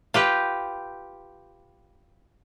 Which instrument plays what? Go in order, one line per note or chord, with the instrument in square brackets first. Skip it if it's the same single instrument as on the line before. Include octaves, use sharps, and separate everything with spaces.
[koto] F4 G4 B4